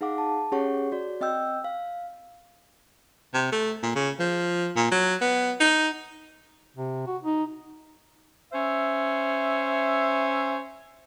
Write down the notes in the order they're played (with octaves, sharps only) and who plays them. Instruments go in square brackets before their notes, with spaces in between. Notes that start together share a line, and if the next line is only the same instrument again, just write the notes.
[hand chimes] D#4 G#4 F5 F#5 D6
A5
C#4 G4 G#4 C#5 F#5 C#6
F#4 D5
C4 D#5 G5 E6 G6
F5
[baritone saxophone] C3
A3
A#2
C#3
F3
A#2
F#3
B3
D#4
[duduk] C3
F#4
D#4
[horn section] C#4 C5 E5